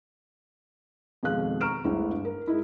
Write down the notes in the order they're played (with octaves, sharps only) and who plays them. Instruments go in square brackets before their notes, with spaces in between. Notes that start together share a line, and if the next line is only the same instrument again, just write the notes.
[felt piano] F2 B2 D#3 G#3 F5 F#6
A#5 C#6 F6 D7 E7
G1 D2 G#3 E4
A#4
G#3 D#4 E4